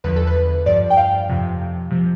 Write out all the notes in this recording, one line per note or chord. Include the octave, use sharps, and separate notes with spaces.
E2 D3 F3 B4
A4
B4
G2 F3 D5
G5
F5
F2 C3 F3
C3 F3